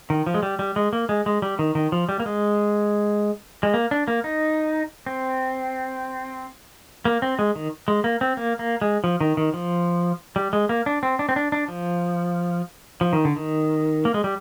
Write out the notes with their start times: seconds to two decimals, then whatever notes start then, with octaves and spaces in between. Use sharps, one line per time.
0.10 D#3
0.27 F3
0.34 G#3
0.43 G3
0.59 G3
0.76 G#3
0.93 A#3
1.09 G#3
1.26 G#3
1.42 G3
1.59 D#3
1.75 D#3
1.92 F3
2.09 G3
2.20 A#3
2.26 G#3
3.63 G#3
3.74 A#3
3.91 D4
4.08 A#3
4.24 D#4
5.06 C4
7.05 A#3
7.22 C4
7.39 G#3
7.55 D#3
7.88 G#3
8.04 A#3
8.21 C4
8.37 A#3
8.59 A#3
8.82 G#3
9.04 F3
9.21 D#3
9.37 D#3
9.54 F3
10.36 G3
10.53 G#3
10.69 A#3
10.86 D4
11.03 C4
11.19 D4
11.29 C4
11.36 D4
11.52 D4
11.68 F3
13.01 F3
13.13 D#3
13.25 D3
13.36 D#3
14.05 A#3
14.14 G#3
14.24 G3